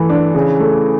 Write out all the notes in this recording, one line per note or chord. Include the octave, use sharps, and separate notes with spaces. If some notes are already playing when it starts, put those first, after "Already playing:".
Already playing: E3 A3
D4
C#3
A3